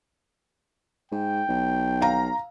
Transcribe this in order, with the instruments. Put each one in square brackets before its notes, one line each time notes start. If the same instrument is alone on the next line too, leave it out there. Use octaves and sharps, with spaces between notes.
[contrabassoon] G#2 [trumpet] G5
[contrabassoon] B1
[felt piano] F5 A#5